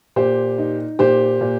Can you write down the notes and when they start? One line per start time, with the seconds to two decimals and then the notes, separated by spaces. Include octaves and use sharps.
0.16 A#2 G4 C5
0.58 D#4
0.99 A#2 G4 C5
1.41 A#2